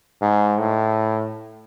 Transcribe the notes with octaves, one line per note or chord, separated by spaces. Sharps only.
G#2
A2